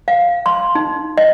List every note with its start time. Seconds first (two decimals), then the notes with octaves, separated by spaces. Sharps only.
0.08 F5
0.46 C6
0.75 D#4
1.18 D#5